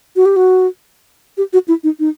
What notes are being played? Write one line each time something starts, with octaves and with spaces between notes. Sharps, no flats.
F#4
G4
F#4
G4
F#4
E4
D#4
D#4